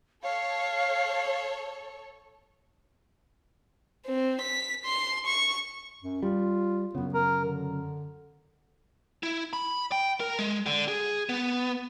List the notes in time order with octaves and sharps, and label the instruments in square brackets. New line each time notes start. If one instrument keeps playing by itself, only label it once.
[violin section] A4 C#5 [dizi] F5
[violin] C4
B6
C6
C#6
[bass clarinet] F#2
[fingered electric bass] G3 [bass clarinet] F4
[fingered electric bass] F#2 C#3 [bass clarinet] B3
[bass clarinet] A#4
D3
[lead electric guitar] E4
B5
G5
A#4
G#3
D3
G#4
B3